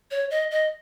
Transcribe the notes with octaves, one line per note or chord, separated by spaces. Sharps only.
C#5
D#5
D#5